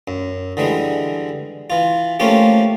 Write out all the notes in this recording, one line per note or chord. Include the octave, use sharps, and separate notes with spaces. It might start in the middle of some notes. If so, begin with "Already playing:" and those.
F#2
D3 E3 G3 G#3
E3 F4
F3 A3 A#3 C#4 F4 G4